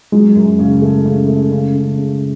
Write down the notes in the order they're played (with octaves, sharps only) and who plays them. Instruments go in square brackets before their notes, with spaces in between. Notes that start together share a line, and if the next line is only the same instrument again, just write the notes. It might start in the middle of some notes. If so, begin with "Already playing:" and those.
[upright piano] F#3 [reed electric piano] G#3
[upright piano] F#2
C#3
A3
C#3
A3
C#3
C#3
C#3